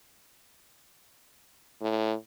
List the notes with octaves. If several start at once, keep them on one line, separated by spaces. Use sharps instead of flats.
A2